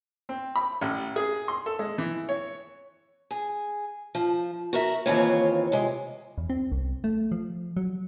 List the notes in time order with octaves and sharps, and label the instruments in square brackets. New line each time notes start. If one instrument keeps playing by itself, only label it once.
[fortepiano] C4
B5
A1
G#4
C6
A4
G#3
E3
C#5
[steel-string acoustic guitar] G#4
F3
F#4 A#4 E5
D#2 C#3 E3 C4 F4 C#5
C3 G#3
[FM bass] E2
C4
C2
A3
F3
F#3